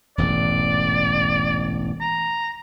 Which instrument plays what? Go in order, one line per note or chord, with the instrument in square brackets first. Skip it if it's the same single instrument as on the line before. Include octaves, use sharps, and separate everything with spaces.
[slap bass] E1 A1 G#2 [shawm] D5
[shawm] A#5